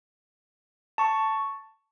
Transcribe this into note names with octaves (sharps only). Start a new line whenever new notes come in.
A5 C#6